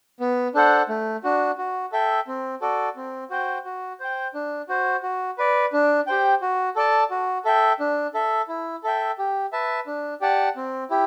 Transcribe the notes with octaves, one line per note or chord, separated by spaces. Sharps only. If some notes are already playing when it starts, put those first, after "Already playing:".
B3
D4 A4 C5 F#5
A3
D4 F#4
F#4
A4 E5 G5
C4
F#4 A4 D5
C4
F#4 C5 G5
F#4
C5 G5
D4
F#4 C5
F#4
B4 D5
D4
G4 C5 G5
F#4
A4 D5 A5
F#4
A4 E5 G5
D4
A4 E5
E4
A4 E5 G5
G4
B4 E5 A5
D4
G4 D5 F#5 A5
C4
E4 G4